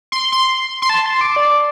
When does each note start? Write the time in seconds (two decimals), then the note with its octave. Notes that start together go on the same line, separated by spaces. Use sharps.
0.12 C6
0.32 C6
0.82 C6
0.90 A5
1.06 C6
1.21 D6
1.36 D5